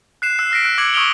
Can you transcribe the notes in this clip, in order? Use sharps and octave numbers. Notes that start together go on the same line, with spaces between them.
F#6 C7 E7
E6 F#6 C7
E6 F6 A#6 B6 D7
F#6 D7
D6 E6 G#6 C#7 F#7
C#6 D#6 F6 D7 F7 G7